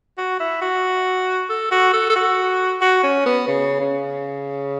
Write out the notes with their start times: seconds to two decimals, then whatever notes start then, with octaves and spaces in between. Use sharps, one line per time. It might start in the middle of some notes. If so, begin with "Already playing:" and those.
0.18 F#4
0.40 E4
0.61 F#4
1.49 A4
1.71 F#4
1.93 A4
2.09 A4
2.15 F#4
2.81 F#4
3.03 C#4
3.25 B3
3.47 C#3
3.80 C#3